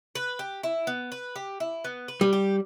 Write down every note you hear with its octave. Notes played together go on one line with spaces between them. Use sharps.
B4
G4
E4
B3
B4
G4
E4
B3
B4
G3
G4